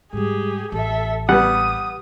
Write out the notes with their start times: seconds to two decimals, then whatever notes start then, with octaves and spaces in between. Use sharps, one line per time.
0.13 G#2 G3 G4 G#4
0.72 A1 A4 E5
1.29 G3 B3 F#5 D#6